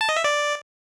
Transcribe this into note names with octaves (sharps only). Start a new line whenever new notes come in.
A5
D#5
E5
D5